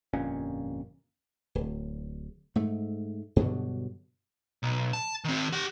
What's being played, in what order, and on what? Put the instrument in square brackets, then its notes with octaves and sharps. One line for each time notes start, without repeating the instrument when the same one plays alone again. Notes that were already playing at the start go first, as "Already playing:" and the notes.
[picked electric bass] G1 F2 A#2 C#4
[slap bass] D1
G#2 A3
G2 B2 D3 F#3
[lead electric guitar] B1
A5
D#3 C4
G4 F#5